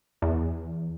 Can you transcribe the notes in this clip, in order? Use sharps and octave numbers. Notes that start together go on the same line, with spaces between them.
E2